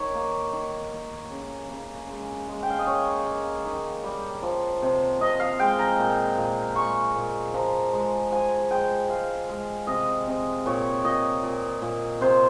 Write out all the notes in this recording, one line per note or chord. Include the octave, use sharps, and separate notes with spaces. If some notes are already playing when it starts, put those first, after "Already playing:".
Already playing: D#3 C#5
A#3
D#3
A#3
C#3
C#3
G#3
G#3
G5
F5
D#5
A#3 C#5
A#3
D#3
G3
F3
C3
C3 D#5
F5
G#3 G5
A#5
A#2
A#2
G#3 C#6
A#2
F3 A#5
G#3
F3 G#5
G#3 G5
G#3 F5
G#3
C3 D#5
C3
A#2 C#5
A#2 D#5
A#2
A#2
C3 C5